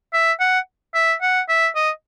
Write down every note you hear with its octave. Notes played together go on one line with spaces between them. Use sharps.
E5
F#5
E5
F#5
E5
D#5